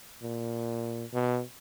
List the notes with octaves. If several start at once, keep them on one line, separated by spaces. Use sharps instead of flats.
A#2
B2